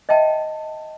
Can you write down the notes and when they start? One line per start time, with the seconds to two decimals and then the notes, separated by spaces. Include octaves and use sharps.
0.09 D#5 E5 G5 A5